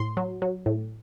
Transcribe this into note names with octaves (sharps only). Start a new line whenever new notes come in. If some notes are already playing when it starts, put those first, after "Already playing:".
Already playing: A2 C6
F#3
F#3
A2